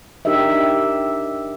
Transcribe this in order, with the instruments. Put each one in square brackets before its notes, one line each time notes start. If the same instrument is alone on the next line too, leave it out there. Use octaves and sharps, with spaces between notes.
[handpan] D4 D#4 G4 A#4 D#5 E5